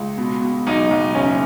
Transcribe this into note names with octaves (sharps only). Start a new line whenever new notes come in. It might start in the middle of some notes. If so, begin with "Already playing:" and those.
Already playing: C#2
B2
B2
B1 D#4
B1
F#1 C#4